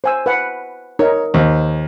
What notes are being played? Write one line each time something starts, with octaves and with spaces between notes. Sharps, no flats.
C5 G#5 E6
B4 F#5
D#4 A#4 C#5
D#2 C5 D#5